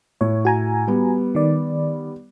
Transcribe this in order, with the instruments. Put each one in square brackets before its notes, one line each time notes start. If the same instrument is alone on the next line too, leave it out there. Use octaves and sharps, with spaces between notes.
[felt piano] A2 [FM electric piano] C#5
[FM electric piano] F#4 G#5 A#5
[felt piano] G3 B3
[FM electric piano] D#3 D5